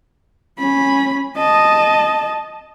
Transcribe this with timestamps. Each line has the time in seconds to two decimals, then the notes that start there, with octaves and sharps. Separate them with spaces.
0.59 C#4 B5
1.38 D#5 A5